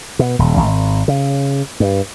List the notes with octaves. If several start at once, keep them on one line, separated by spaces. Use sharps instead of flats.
B2
D#1
G#1
C#3
G2